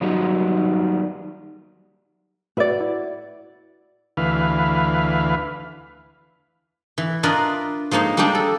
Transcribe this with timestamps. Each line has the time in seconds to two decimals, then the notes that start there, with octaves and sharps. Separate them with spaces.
0.01 D#3 F#3 G3 B3 D#4 F4
2.57 A2 F#4 B4 D5 E5
2.81 E4
4.17 D2 E3 B4 F5
6.98 E3
7.23 D4 F4 A#4 B4 D5 D#5
7.91 F3 G#3 A#3 D#4 C#5
8.17 G3 G#3 A#3 D4 G4
8.35 A4